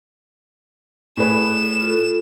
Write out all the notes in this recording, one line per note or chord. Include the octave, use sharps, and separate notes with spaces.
A2 G#4 B4 E7
F4 A4